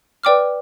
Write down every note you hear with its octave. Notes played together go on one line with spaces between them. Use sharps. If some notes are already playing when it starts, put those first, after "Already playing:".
B4 D5 G5 D6 F6